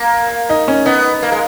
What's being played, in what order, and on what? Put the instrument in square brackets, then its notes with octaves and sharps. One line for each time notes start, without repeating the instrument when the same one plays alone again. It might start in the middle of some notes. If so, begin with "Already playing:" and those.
Already playing: [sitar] A#3
[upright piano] D#4
C#4
[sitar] B3 [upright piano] D#4
[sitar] A#3
G#3